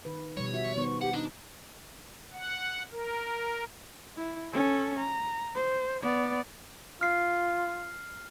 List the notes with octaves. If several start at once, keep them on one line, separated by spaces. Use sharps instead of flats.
D#3 B4
B2 F3 G3 C#5
F#4 E5
D#3 B3 C5 C#6
G4 F#5
D4 D#4
F#5
A#4
E4
C#4 A4
A#5
C5
B3 D5
F4 F6 C7